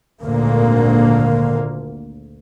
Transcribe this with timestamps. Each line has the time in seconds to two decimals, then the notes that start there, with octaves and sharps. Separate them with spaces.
0.23 G#1 D2 A#2 D3 A#3